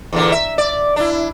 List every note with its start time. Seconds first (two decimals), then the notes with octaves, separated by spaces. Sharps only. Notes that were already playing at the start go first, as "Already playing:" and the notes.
0.13 E2 A#2 D3
0.32 E5
0.58 D5
0.96 D4 E4